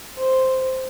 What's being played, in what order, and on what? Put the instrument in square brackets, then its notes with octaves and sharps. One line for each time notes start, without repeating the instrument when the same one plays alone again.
[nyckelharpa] C5